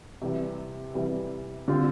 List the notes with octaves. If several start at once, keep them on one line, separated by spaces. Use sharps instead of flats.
C3 E3 G3
C3 E3 G3
D3 G3 C4 F4